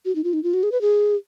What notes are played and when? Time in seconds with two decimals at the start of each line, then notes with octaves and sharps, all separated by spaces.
0.05 F#4
0.15 D#4
0.24 F4
0.33 D#4
0.43 F4
0.54 F#4
0.63 G#4
0.72 B4
0.81 G#4